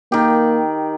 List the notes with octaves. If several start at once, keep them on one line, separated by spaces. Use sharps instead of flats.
D#3 A#3 G4